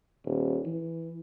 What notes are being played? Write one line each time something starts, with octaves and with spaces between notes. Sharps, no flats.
D#1
E3